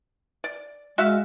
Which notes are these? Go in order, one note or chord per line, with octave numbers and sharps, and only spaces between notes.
D5
G#3 F#4 E5 F5